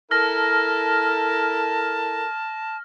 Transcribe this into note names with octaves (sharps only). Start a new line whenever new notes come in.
E4 A4 A#4 A5 F6 A#6